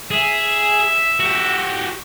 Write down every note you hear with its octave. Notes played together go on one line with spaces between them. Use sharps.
G#4 E5
F#4 G4